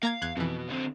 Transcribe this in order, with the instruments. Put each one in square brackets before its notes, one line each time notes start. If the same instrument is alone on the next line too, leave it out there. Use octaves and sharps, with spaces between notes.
[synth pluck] A#3 A#5 G#6 [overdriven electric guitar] F5
[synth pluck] E2 F#6 G#6
[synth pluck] F2 E3 [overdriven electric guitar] B2
[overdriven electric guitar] D3 C4